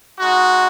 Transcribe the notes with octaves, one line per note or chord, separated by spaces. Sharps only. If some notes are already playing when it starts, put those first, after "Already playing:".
G#3 D#4 F#4